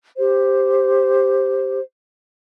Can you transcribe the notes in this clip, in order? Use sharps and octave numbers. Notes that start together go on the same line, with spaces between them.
G4 C5